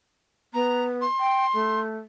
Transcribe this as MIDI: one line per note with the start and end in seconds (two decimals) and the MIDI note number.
0.54 1.04 59
0.54 0.86 82
1.01 1.80 84
1.20 1.46 79
1.54 1.99 57